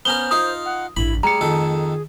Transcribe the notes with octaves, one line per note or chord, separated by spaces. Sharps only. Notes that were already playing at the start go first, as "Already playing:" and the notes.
B3 C#4 A#4 C5 G7
D#4 F4 A#4 D#6
F#5
A1 G2 E4 B5
G3 A3 G#4 A#5 C#7
F2 D#3 A4